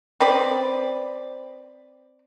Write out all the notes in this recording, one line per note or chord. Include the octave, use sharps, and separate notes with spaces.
C4 B4 D5